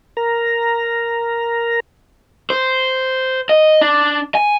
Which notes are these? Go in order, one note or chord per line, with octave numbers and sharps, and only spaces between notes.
A#4 A#5
C5
D#5
D4
G#5